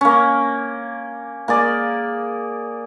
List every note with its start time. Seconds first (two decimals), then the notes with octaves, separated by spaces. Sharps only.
0.01 A#3 C#4
1.48 A#3 G#4 D5